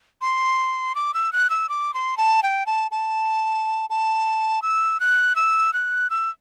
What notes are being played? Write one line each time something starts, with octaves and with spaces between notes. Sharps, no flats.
C6
D6
E6
F#6
E6
D6
C6
A5
G5
A5
A5
A5
E6
F#6
E6
F#6
E6